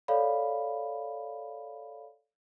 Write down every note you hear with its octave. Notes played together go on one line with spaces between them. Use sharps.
A4 C#5 D5 F5 B5